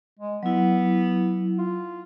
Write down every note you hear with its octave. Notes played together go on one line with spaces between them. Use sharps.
G#3
F#3 B3 E4
F4